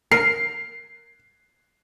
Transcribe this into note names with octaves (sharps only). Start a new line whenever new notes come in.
A#4 C7